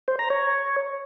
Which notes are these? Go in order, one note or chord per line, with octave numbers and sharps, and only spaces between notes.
C5
A#5
C#5